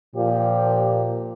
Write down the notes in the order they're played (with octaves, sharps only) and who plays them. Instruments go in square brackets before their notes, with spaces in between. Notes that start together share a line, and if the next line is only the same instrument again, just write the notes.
[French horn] A#2 [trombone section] F3 G4